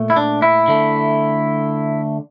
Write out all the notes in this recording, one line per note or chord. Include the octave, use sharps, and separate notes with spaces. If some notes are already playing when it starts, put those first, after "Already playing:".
Already playing: A#2 A3
E4
D4
E4
D3 A3